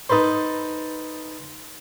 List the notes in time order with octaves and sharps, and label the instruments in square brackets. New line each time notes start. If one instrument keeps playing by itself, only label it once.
[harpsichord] D#4 A4 B4 C5